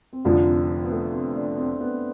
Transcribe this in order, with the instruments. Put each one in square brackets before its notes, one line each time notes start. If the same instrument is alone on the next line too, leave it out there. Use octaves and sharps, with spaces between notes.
[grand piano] C4
[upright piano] F1 F2 D3 F3 [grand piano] D4
[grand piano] C4
B3
A3
C4
D4
C4
B3